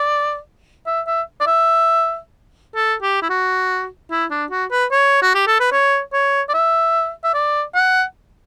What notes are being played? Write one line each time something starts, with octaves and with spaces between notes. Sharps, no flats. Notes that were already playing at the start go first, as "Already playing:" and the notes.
Already playing: D5
E5
E5
D5
E5
A4
G4
E4
F#4
E4
D4
F#4
B4
C#5
F#4
G4
A4
B4
C#5
C#5
D5
E5
E5
D5
F#5